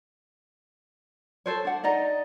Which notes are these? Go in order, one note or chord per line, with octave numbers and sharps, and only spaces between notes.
A4 C5 C#5
D4 F#5
D#4 D5 D#5 A#5